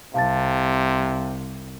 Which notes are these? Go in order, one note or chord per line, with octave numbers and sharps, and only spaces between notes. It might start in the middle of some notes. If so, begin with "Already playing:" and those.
C2 C3 F5 A5 A6